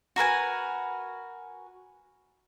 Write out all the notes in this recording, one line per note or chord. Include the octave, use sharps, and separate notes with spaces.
F#4 A#4 B4 G#5